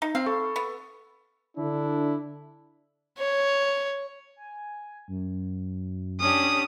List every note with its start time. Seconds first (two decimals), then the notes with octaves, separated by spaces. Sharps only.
0.02 D#4
0.15 C4 F5
0.26 A4 B5 C#6
0.56 B3
1.57 D3 D4 E4
3.18 C#5
4.36 G#5
5.08 F#2
6.20 C#4 D4 G4 D#6